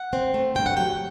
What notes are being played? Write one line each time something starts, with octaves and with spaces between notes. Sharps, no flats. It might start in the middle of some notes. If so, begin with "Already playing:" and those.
Already playing: F#5
C4
A3
G2 G5
F#5
F#3 G5